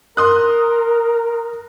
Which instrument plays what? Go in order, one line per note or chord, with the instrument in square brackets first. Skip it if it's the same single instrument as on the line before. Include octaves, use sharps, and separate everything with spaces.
[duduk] A#4 [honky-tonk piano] C6 D#6 F#6